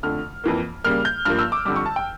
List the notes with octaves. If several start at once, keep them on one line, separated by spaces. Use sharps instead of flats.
F2 D3 A3 F6
F2 E3 A#3
C#3 G3 A#3 F6
G6
G2 F3 A#3 F6
E6
D6
F2 D3 G3 D6
C#6
A5
G5